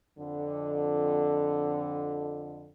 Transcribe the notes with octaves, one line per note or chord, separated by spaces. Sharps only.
F2 D3